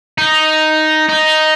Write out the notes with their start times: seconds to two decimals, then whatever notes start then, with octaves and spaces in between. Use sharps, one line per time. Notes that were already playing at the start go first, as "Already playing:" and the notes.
0.18 D#4
1.09 D#4